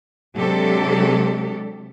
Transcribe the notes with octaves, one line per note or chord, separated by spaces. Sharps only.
C3 F#3 G#3 D4 G4 A4